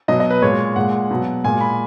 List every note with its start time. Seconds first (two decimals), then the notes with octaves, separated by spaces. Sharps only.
0.08 B2 F#3 D#5
0.20 D#5
0.30 B4
0.42 A#2 G#3 C#5
0.76 A#2 G#3 F#5
1.11 B2 F#3
1.44 A#2 G#3 G#5
1.61 B5